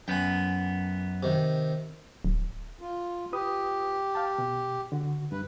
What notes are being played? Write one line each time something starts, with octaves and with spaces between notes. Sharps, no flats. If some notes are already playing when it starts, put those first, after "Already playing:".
F#2 B3 G5 G#5
C3 D#3
D1
F4
F4 G4 B4 D#6
F5 G5 A5
B2
D3 F#4
G2 B4